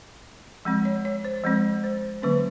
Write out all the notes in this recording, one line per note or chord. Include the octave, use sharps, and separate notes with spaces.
F3 G#3 C4
C#5
C#5
C5
F3 G#3 C4
C5
D3 F#3 A#3 C#4 B4